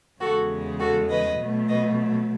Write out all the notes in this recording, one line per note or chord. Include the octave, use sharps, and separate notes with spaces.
E2 C#3 G#3 F#4 A4
F#4 A4
B4 D#5
B2 F#3 A3
B4 D#5